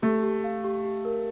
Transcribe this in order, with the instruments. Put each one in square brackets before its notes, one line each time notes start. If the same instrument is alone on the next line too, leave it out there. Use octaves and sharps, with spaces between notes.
[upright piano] A3 [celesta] G4
[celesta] G4
F5
G4
G4
A#4